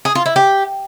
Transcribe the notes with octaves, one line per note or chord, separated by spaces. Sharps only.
G#4
F4
E4
G4